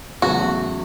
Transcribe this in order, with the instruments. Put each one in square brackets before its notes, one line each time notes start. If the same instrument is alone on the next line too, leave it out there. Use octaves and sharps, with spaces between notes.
[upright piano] E2 C#3 F#3 A3 [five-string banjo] F#4